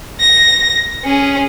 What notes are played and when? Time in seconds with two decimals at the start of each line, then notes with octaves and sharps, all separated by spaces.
0.20 A#6
1.04 C#4 G#4